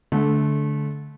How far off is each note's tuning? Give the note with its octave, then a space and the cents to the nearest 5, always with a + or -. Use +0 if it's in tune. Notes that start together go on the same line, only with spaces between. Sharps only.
D3 -15 A3 -25